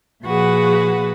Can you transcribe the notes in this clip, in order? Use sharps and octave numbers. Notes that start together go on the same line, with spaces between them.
A#2 F3 F#4 G#4 B4 F#5